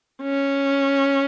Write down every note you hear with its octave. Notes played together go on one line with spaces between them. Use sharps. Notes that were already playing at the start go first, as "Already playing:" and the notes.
C#4